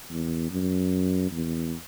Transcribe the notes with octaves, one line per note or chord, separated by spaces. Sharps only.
E2
F#2
E2